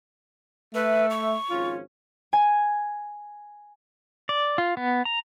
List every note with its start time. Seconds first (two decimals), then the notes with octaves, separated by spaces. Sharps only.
0.75 A3 B4 E5
1.11 C#6
1.50 G#1 F3 C#4 F4
2.33 G#5
4.29 D5
4.58 F4
4.77 B3
5.05 A#5